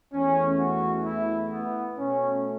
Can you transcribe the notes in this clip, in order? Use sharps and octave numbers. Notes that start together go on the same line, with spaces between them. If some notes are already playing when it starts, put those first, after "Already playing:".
E2 E3 A3 C#4
F#4
E4
B3
B2 A3 C#4